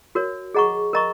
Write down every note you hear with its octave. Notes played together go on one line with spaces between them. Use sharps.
F#4 A#4 C#5
G#4 D#5 F#5 A#5 C#6
A#4 D#5 A#5 C#6